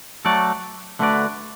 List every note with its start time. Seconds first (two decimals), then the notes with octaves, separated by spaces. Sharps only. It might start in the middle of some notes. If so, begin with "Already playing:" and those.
0.25 F#3 A3 F#4 A4 D5
0.99 D3 A3 F#4 B4 D5